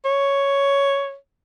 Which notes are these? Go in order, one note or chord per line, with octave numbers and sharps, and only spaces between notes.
C#5